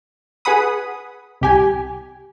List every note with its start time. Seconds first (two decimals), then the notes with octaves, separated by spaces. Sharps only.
0.45 G#4 B4 F#5 B5 D#6
1.41 C2 G4 G#5